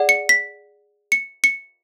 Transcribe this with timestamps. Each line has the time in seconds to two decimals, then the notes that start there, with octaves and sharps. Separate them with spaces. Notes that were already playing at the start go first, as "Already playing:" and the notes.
Already playing: G#4 D5 F#5
0.09 C#7
0.29 B6
1.12 C#7
1.44 C#7